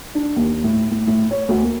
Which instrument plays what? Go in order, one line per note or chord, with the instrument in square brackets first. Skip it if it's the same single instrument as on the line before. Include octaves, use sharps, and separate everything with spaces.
[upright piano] D4
D#2
A2
A2
A2
C#5
D2
A#3